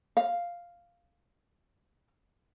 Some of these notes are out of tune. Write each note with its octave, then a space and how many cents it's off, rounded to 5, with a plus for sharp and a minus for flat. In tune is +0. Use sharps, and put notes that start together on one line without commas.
F5 +0